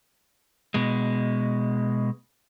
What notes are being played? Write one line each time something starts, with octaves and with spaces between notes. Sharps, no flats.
B2 G#3